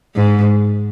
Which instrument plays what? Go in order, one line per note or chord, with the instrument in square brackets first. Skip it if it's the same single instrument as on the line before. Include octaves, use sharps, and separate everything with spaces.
[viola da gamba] G#2